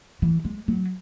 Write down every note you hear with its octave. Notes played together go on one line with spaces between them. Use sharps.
E3
G#3
F#3